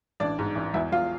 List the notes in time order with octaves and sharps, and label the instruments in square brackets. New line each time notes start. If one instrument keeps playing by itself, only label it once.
[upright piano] A1 D4 D5
G#2
A1
E2 E4 E5
E2 F4 F5